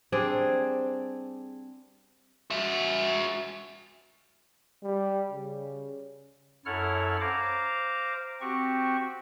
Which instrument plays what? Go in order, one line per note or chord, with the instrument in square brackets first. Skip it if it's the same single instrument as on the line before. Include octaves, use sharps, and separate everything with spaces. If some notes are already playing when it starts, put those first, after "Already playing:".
[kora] G3 C4 D4 G#4
[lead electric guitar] F#4 E5
[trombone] G3
C#3
[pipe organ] F#2 E4 A4 C#5 F#5 F6
C5 F5 A#5 D6
C4 F#4 G4 C#6